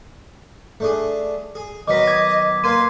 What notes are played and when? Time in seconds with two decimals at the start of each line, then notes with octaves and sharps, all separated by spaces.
0.80 A3 D4 G#4
1.55 G#4
1.88 D#3 F#3 B3 D#5 D6 B6
2.07 D6 G#6
2.64 A#3 A#4 B4 C6 G#6 D#7